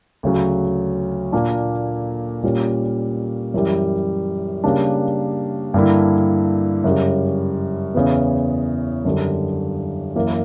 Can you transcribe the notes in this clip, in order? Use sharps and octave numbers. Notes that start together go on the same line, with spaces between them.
D2 C#3 F#3
A#2 A#3 D4
A#2 G3 C#4
F#2 E3 G3
C#3 G3 A#3 D4
G2 D3 A#3 E4
F#2 C#3 G3
E2 C#3 E3 B3
F#2 D3 G3
F#2 E3 A#3